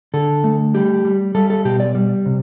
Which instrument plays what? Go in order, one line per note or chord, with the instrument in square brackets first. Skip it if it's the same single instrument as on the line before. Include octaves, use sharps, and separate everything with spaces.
[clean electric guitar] D3 A4
A3
G3 G4
G3
G3 A4
A4
B2 G4
D5
G3
C3